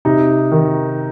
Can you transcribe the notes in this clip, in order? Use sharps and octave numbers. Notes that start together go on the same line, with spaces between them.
C3 D#4
D#3